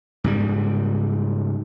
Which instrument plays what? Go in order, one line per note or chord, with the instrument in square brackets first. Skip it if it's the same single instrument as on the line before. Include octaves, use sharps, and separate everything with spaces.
[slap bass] G#2 C#3 G3